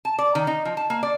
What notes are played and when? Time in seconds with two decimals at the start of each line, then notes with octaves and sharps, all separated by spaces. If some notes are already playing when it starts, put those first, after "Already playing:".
0.05 A5
0.18 D5
0.35 D#3
0.47 D#4
0.65 F3
0.77 A5
0.90 A#3
1.03 D5